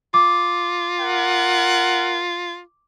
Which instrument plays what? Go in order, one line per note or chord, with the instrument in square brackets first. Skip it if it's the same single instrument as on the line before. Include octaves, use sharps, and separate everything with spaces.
[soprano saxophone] F4 [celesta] D6
[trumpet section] A#4 F#5